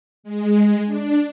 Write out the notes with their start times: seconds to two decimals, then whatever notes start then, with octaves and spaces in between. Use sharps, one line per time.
0.24 G#3
0.86 D4